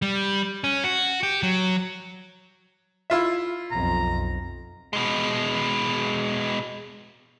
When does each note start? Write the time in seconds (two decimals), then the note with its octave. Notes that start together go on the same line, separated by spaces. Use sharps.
0.02 G3
0.64 C#4
0.84 F#4
1.23 G4
1.43 F#3
3.10 E4 F4 E5
3.71 B1 F2 A#5
4.93 B2 G#3